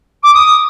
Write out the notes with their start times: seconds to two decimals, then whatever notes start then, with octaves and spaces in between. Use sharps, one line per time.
0.23 D6
0.34 D#6